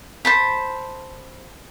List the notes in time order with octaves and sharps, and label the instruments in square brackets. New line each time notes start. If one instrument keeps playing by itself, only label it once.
[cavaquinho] C5 A5 B5